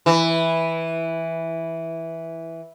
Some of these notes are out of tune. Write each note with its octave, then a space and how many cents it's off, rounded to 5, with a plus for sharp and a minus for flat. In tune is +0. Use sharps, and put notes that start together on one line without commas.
E3 -5